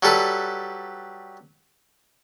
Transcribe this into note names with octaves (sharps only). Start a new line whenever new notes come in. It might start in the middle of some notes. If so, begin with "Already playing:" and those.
F#3 G3 A4 B4